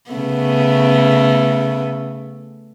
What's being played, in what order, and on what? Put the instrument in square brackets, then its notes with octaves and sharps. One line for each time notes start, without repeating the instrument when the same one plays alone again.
[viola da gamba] C#3 A3 B3